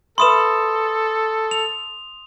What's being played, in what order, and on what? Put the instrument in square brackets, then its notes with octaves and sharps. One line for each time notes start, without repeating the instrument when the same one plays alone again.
[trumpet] A4 [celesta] B4 E5 B5 [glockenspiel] C6 D#6 E7
[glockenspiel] F7